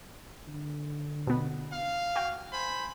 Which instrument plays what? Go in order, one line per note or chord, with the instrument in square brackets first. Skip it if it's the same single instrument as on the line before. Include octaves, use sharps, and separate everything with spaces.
[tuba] D3
[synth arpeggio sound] B2 B3
[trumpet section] F5
[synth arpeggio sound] F#4 G5
[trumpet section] C5 G#5 B5